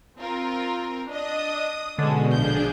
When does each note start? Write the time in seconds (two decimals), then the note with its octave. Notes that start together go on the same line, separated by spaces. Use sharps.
0.18 C4 F4 A#4
1.09 D4 D#5 D#6
1.98 B2 D3 G#3 C#4 A4
2.33 A#1 F3 D4 G#4 G6